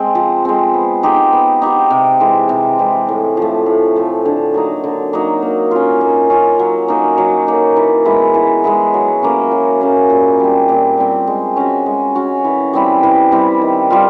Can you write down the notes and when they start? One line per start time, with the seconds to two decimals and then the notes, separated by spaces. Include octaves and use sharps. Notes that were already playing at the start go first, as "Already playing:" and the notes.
Already playing: G#3 C4
0.15 F3
0.45 G#3 C4
0.74 B3
1.03 D#4 G4 C5
1.32 B3
1.62 D#4 G4 C5
1.91 C3
2.20 E3 G#3 C4
2.49 C3
2.79 E3 G#3 C4
3.09 A2
3.37 F3 A3
3.66 A2
3.96 F3 A3
4.25 D3
4.54 F#3 A#3 D#4
4.84 D3
5.13 F#3 A#3 D#4
5.42 A#3
5.71 C#4 F4
6.01 A#3
6.30 C#4 F4
6.59 F#3
6.88 A#3 D#4
7.18 F#3
7.47 A#3 D#4
7.77 E3
8.05 G#3 B3 E4
8.34 E3
8.64 G#3 B3 E4
8.94 F#3
9.23 A#3 C#4
9.51 F#3
9.81 A#3 C#4
10.10 A#2
10.40 G3 C4
10.69 A#2
10.98 G3 C4
11.27 G#3
11.56 C#4 F#4
11.86 G#3
12.15 C#4 F#4
12.44 E3
12.73 G3 C4 E4
13.03 E3
13.32 G3 C4 E4
13.61 D#3
13.90 G3 C4 F4